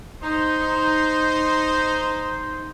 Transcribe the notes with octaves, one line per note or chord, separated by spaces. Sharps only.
D#4 C5